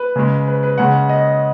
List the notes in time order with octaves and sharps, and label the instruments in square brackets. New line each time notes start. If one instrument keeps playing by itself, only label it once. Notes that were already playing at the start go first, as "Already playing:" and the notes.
Already playing: [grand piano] B4
C#3 G#3
B4
B4
C#3 G#3 F#5
D#5